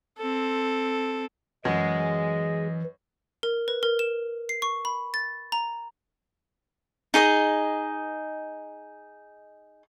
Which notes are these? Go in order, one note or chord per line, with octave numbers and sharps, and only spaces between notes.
C4 A4
F#2 E3 G#3 D#5
A#4
B4
A#4
E7
C7
C#6
B5
A6
A#5
D#4 G#4 D#5